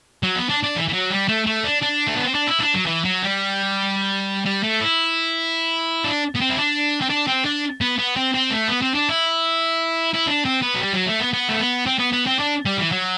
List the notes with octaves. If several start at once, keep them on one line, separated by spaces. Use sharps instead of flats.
F#3
B3
D4
D4
E3
E3
F#3
G3
A3
A3
D4
D4
A3
B3
C4
D4
E4
D4
F#3
E3
F#3
G3
G3
A3
E4
D4
B3
C4
E4
D4
C4
D4
C4
D4
B3
B3
C4
C4
A3
B3
C4
D4
E4
E4
D4
C4
B3
F#3
G3
F#3
A3
B3
B3
A3
B3
C4
B3
B3
C4
D4
G3
E3
F#3